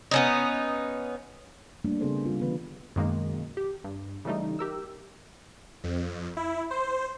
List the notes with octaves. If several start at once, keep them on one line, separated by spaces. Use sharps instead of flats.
B3 C#4 D#4
G3 A3 A#3 D4
C#3 B3 C4 G#4 A4 C5
G3 F4
D3 E3 B3 B4
F#2 B2 D#3 G#3 A#3
G4
G2
C#3 E3 G3 A3 D#4
G4 A#4 E6
F2
E4
C5